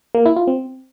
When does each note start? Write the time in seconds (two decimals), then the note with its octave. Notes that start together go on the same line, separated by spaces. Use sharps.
0.15 A#3
0.26 E4
0.36 F4
0.47 C4